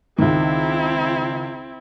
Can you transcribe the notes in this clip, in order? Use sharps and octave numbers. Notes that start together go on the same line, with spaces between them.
C#2 D#3 C4 E4